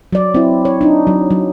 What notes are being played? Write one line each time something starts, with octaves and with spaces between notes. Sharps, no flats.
F#3 D5
C4 E4
C#5
D4 D#4
F#3
F#3